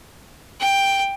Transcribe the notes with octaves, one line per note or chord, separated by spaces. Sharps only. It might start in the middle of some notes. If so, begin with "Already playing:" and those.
G5